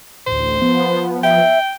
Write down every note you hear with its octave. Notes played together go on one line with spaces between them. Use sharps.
A1 D2 C5
F3 B3
E5 G5